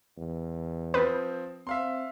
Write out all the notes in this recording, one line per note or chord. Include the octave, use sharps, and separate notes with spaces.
E2
F3 C4 B4 D#6
C4 E5 F5 C6